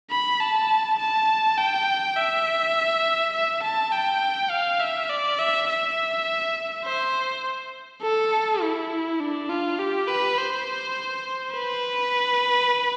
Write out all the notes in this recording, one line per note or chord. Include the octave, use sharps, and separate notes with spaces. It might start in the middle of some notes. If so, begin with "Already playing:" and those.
B5
A5
A5
G5
E5
E5
A5
G5
F5
E5
D5
E5
E5
C5
A4
E4
D4
F4
G4
B4
C5
B4